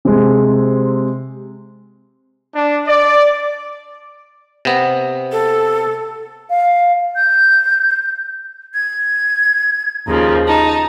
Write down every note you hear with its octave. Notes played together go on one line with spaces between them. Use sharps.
C3 G#3
D4
D5
C3 B3
A4
F5
G6
G#6
D#2 C#3 F3 A#5
D#4 A5